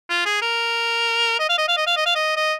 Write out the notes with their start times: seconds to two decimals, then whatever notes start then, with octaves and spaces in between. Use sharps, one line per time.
0.09 F4
0.25 G#4
0.42 A#4
1.39 D#5
1.49 F5
1.58 D#5
1.68 F5
1.77 D#5
1.87 F5
1.96 D#5
2.06 F5
2.15 D#5
2.36 D#5